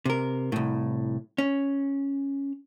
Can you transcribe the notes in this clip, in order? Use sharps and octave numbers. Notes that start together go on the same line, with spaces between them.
C3 A#4
C2 A2
C#4